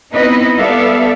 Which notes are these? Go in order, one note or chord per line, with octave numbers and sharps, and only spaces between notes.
B3 C4 D#4 E4 B4 D#5
G3 B3 A4 D5 E5 F5